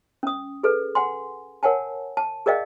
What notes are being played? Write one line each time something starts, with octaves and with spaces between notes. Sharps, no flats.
C#4 D#6
G#4 A4 B4
F#5 G#5 C6
A#4 C#5 F#5 G#5 A5
A5
G#4 A#4 D5 D#5 F5 G5